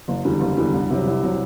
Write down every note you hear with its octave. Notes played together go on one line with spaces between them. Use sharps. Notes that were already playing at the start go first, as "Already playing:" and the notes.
F#1
E2 D3 G3
F#1
E2 D3 G3
C2
C3 F#3
C2
C3 F#3